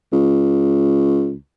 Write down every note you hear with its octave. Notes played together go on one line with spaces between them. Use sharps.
C#2